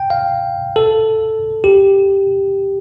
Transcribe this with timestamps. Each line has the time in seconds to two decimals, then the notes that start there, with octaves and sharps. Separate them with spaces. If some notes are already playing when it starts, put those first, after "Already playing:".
Already playing: G5
0.10 F5
0.76 A4
1.64 G4